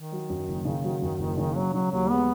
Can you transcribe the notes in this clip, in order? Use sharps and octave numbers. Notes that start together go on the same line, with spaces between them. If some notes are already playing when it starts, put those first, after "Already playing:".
Already playing: D#3
F#3
F#2
F#1
C#3
F#3
F#2
F#1
C#3
F#3 C#4
C#3 F#3
D#2 F#3
G#3 B3